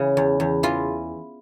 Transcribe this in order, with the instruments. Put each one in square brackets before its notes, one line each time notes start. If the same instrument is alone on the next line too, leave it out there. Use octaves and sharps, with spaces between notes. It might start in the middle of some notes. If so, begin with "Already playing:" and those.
Already playing: [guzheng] C#3 E3
E2
E2
E3 F4